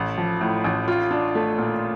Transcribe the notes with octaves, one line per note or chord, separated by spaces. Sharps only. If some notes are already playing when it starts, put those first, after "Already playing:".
Already playing: A1
F3
A2
A1
F4
D4
A3
A#2